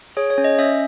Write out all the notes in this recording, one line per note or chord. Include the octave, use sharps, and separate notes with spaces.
G#4 C#5
C#5
C#4
D#5
C#4 E5